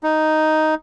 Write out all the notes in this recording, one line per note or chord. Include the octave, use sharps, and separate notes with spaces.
D#4